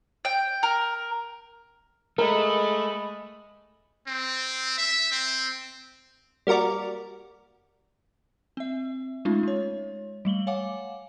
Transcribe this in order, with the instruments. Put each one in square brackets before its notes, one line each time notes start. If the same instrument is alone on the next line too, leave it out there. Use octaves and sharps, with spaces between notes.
[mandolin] G5
A#4
[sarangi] G#3 [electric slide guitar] A3 [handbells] A#4 A#5 [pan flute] B5
[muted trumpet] C4
E5
C4
[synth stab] G3 A#3 F#4 A#4 D5
[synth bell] C4 E5
G#3 A3 C#4 D#4 F4
G#3 C#5
G3 A3 F#7 G7
C#5 F5 F#5 G#5 D6